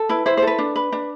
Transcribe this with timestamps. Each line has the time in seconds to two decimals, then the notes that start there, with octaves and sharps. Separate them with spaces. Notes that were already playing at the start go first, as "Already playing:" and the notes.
Already playing: A4
0.09 E4 B4
0.26 E4 C5
0.37 C5
0.42 A4
0.47 B4
0.59 D4
0.76 B4
0.92 D4